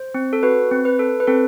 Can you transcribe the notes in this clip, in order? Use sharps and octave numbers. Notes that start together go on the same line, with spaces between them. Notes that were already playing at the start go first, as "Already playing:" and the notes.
Already playing: C5
C4
A4
F#4 B4
C4
B4
A4
B4
C4 A4